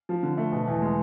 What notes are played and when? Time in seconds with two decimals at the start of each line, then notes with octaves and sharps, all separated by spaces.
0.09 F3
0.23 D3
0.38 A3
0.52 B2
0.67 E2
0.82 G#3